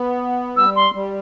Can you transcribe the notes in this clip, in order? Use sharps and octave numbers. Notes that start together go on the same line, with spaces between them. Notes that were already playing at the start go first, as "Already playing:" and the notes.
Already playing: B3
G3 E6
C6
G3